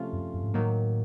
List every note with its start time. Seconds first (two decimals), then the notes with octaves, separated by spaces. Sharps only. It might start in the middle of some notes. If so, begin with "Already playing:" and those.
Already playing: C3 F3 A3 C#4 F4
0.13 F#2
0.34 F#2
0.43 G#2
0.54 A2 D#3 F#3 A#3